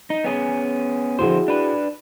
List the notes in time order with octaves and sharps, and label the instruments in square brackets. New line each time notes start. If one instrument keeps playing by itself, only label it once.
[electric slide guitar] D#4
B3 C#4 G#4
[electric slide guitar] F2 D3 C5 [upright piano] E4 F#4 G#4
[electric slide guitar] D4 B4